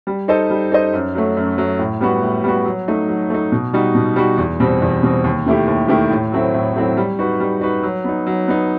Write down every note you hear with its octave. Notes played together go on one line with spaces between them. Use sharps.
G3
D#4 A4 C5 D#5
G3
D#4 A4 C5 D#5
F#2
F#3 A3
F#2
F#3 A3
A2
G3 B3 F#4
A2
G3 B3 F#4
F#3
A3 D#4
F#3
A3 D#4
B2
G3 D#4 F#4
B2
G3 D#4 F#4
E2
B2 G3 C4
E2
B2 G3 C4
D#2
D#3 A3 E4 G4
D#2
D#3 A3 E4 G4
A2
F#3 A3 C4 E4
A2
F#3 A3 C4 E4
G3
D#4 F#4 B4
G3
D#4 F#4 B4
F#3
B3 D#4
F#3
B3 D#4